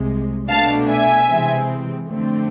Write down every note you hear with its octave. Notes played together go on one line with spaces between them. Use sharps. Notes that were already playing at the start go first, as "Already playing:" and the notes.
Already playing: C2 C3 G#3
B2 A3 D4 F5 A5
E5 G#5
C3 E3 G#3 C4
F2 D3 A3 C4